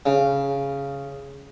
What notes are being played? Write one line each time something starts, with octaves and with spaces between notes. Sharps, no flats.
C#3